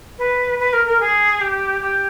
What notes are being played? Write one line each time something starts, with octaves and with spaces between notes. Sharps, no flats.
B4
B4
A#4
A#4
G#4
G4
G4